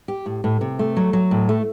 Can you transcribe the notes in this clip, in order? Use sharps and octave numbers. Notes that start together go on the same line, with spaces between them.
G4
A2
A2
C3
A3
F#3
F#3
A2
A3